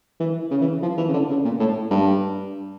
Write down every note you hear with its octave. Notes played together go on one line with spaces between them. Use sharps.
E3
C#3
E3
F3
E3
C#3
D3
C#3
A#2
A2
G2